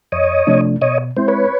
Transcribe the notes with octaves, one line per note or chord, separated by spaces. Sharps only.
F2 C#5 D#5
C3 F3 A3 D4
B2 C#5 D#5
G#3 C4 E4 C5
B4 C#5